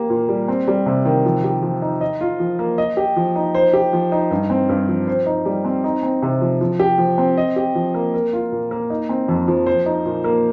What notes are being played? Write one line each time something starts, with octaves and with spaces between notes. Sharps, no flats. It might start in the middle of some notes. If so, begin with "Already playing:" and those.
Already playing: A#3 G4
A#2
G3
C4
G3
C3
D#3
F3
G4
F3
D#4
D#5
F4
F3
A#3
D#5
G4
F3
D#4
C5
G4
F3
D#4
G2
C4
G2
F3
C5
D#4
G3
C4
D#4
C4
C3
F3
F3
G4
F3
C4
D#5
G4
F3
A#3
A#4
F4
A#2
A#3
D#4
C4
F2
F3
C5
D#4
A#2
A#3